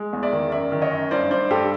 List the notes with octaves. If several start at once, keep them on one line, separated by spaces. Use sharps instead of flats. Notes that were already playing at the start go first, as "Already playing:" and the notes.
Already playing: G#3
E2
D5 E5
D#3
F#2 D5 E5
D#3
C#5 D#5
F#2
G2 C5 D5
G2 C5 D5
G2 G4 A4